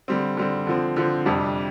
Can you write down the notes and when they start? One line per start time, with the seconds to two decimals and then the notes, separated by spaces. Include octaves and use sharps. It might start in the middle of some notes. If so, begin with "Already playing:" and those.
0.08 D3 G3 C4
0.37 D3 G3 C4
0.67 D3 F3 C4
0.96 D3 F3 C4
1.25 F2 C3 G3 D4